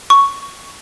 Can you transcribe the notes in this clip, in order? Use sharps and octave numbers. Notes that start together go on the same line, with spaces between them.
C#6